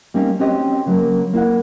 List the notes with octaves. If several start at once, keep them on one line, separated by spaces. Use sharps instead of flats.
G3 A#3 C4 C#4 D#4
C4 C#4 F#4 G4 C5 D#5
C#3 F#3 A3 A#3
A#3 E4 F5 F#5